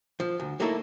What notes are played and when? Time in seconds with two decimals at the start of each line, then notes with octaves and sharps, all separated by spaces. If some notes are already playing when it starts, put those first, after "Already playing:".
0.20 F3
0.40 D2
0.60 F#3 A3 A#3 D#4 E4 A4